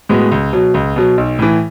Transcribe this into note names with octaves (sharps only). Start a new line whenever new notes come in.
A2 G#3 B3 F#4
C#2
B2 F#3
C#2
B2 F#3
B1
A2 E3